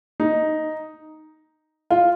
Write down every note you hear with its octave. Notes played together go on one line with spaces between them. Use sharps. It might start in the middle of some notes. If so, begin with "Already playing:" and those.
D#4
F4